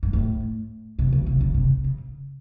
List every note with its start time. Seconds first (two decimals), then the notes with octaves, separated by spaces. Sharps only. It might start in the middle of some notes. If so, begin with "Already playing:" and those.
0.03 G#2
0.13 A2
0.99 C3
1.13 C#3
1.26 C3
1.41 C#3
1.54 C3
1.84 C#3